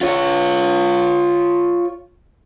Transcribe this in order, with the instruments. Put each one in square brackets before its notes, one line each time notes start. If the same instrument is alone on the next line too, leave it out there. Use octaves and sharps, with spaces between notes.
[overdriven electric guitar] F4 C#5